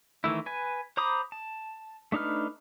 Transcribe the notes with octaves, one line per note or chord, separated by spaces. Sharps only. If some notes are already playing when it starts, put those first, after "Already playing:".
D#3 E3 A3 E4
B4 G#5
C5 A#5 B5 D6 D#6
A5
A3 D4 D#4 B4 F6